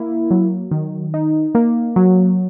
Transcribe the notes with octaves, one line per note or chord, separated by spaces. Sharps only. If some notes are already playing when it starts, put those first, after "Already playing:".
Already playing: A#3 E4
F#3
D#3
D#4
A#3
F#3